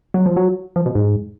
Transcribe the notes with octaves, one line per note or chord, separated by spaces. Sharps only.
F#3
F3
F#3
F3
B2
G#2